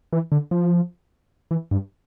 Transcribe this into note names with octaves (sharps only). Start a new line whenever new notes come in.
E3
D3
F3
E3
G2